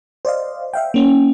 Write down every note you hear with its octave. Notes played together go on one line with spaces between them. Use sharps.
C5 D5 D#5 F5
E5 F5 G5
A#3 C#4